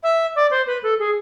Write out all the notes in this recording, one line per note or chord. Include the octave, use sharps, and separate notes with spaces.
E5
D5
C5
B4
A4
G#4